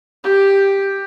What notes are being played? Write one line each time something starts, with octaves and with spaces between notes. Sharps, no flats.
G4